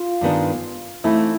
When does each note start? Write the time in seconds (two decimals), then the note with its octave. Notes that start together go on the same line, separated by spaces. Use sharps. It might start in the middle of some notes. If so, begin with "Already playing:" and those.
Already playing: F4
0.21 G2 D#3 G#3 B3 D4
1.04 E3 A3 C4 D#4 E4